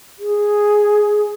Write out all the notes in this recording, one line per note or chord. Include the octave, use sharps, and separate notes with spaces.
G#4